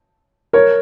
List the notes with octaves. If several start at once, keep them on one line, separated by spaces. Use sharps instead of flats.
A#4 C#5